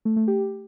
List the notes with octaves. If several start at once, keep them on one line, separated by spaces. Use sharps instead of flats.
A3
A3
G4